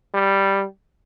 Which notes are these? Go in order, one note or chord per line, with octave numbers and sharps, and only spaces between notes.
G3